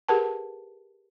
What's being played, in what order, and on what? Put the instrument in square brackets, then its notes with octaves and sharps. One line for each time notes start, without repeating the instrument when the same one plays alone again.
[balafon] G4 G#4 A#4 B4 F#5 A5